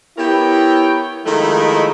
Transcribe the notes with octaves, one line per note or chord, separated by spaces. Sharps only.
B3 E4 G4 A#4 C#5 G5
D#3 F3 G#3 A3 D#4 E4